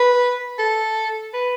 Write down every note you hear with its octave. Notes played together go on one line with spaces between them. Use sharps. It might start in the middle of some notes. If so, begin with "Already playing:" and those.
Already playing: B4
A4
B4